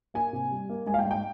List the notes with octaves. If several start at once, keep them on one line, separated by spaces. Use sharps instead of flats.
A#3 G#5
C3
G3
A#3
G#2 G#5
F5
G5
G#2
G5